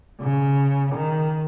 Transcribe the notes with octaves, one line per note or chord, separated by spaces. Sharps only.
C#3
D#3